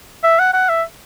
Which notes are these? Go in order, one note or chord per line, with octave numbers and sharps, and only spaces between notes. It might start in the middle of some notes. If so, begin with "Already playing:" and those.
E5
F#5
F#5
E5